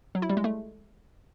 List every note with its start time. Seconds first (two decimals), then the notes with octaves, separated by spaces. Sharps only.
0.15 F#3
0.22 E4
0.30 G3
0.37 G#3
0.44 A3